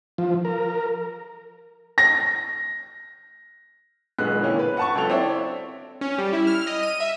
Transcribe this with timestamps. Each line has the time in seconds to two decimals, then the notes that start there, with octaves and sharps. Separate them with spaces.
0.18 F3
0.45 A#4
1.98 A#6
4.18 D#1 B1 G#3 B3 F#6
4.40 D3 E3 A#3 C4 C#4
4.59 B4
4.77 F#5 A5 C#6
4.95 C#2 F#3 A4 F7
5.10 C4 E4 C#5 D5 E5
6.01 C#4
6.18 G3
6.33 E4
6.47 F6
6.67 D#5
6.83 D#7
7.00 E5